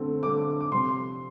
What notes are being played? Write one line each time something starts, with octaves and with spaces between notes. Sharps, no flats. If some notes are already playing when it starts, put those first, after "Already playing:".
Already playing: D3 A3 C4
D3 A3 C4 D6
D6
C3 F3 C4 C6